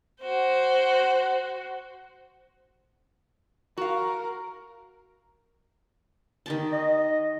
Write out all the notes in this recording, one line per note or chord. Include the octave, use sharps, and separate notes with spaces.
F#4 C5
F#4 A#4 F5
D#3 G4 A5
D#5